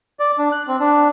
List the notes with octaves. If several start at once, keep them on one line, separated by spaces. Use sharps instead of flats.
D5
D4
F#6
C4
D4